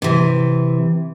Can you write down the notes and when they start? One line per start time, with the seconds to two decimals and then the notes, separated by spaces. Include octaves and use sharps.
0.02 C3 E3